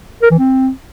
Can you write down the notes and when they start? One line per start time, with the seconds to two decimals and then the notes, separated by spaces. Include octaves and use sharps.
0.23 A#4
0.31 E3
0.39 C4